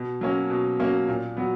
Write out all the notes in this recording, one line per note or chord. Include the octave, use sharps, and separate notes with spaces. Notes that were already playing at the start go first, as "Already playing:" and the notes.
Already playing: B2
F#3 A#3 C#4
B2
F#3 A#3 C#4
A#2
F#3 B3